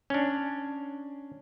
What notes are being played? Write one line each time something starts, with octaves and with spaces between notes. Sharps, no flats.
C#4 D4